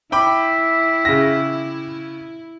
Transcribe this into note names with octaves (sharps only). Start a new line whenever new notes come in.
E4 E5 G5 B5 D6
C#3 A#6